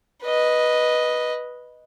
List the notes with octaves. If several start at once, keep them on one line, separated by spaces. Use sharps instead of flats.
B4 D#5